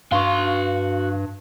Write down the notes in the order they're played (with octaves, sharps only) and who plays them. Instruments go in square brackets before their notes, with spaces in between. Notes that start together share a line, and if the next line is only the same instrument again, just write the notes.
[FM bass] G2 [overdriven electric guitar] F#4 C6 [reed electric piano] F5 C#6